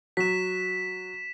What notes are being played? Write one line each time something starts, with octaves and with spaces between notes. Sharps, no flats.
F#3 B6 E7